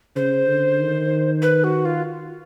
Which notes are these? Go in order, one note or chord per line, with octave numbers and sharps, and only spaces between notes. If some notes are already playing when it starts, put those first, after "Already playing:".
C#3 C5
D3
D#3
B4
F#4
F4